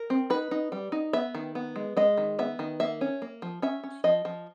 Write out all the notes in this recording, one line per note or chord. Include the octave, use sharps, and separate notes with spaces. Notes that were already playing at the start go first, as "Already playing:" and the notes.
Already playing: A#4
C4
D#4 B4
D#4
G3
D#4
B3 E5
D#3
B3
G#3
G#3 D#5
D#3
B3 E5
D#3
A#3 E5
C#4
A#3
F3
C#4 E5
C#4
F3 D#5
F3